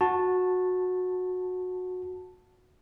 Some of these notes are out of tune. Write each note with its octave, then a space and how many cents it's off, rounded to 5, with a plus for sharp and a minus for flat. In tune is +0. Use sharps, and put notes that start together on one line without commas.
F#4 -15 A5 +0